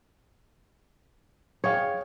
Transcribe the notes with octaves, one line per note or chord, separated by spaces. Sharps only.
G#4 C#5 F5 G5